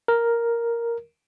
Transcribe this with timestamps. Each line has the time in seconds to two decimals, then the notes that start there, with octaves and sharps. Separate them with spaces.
0.08 A#4